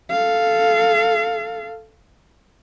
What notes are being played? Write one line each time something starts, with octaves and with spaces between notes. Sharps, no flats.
A4 F5